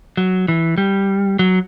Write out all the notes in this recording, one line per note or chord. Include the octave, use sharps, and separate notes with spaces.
F#3
E3
G3
F#3